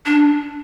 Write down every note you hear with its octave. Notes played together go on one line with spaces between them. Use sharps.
D4